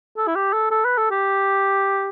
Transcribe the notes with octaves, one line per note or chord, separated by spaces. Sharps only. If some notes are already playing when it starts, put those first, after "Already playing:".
A4
E4
G4
A4
A4
B4
A4
G4